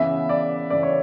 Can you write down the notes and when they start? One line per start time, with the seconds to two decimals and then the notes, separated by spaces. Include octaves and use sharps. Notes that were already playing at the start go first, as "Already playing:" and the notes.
Already playing: C#3 E3 B3 E5
0.29 D5
0.70 C#3 E3 B3 D5
0.83 C#5